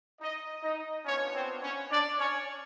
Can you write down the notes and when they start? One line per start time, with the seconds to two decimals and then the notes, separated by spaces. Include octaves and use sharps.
0.20 D#4 D#5
0.62 D#4 D#5
1.05 B3 C#4 D4 F4 C#5
1.34 C4 C5
1.62 C#4 C#5
1.90 D4 D5
2.18 C#4 C#5